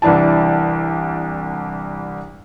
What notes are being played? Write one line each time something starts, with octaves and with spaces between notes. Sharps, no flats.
C2 E3 D4 E4 A5